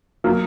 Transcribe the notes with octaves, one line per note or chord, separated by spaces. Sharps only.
F#3 A#3